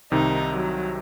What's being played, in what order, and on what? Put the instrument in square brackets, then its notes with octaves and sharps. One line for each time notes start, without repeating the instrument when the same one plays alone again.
[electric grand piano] C2 C3 D#3 [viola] D#4
[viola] F#3